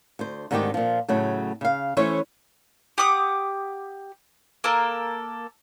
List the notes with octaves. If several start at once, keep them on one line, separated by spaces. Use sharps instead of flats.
D2 C5
G#2 D3 D#3 A3 C4 G4
A#2 F3
A2 C#3 F#3 A3
C#3 F5
E3 A3 C#4 C5 C#5
G4 F#5 D6 D#6
A#3 A4 A#4